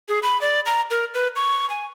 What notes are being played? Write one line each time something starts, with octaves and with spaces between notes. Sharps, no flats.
G#4
B5
D5
A#5
A#4
B4
C#6
G#5